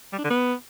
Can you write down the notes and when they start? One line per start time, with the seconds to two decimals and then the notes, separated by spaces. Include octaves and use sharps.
0.13 G3
0.18 D4
0.24 D3
0.30 B3